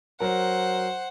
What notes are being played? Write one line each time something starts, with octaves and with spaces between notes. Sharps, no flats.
F#3 A#4 C5 F#5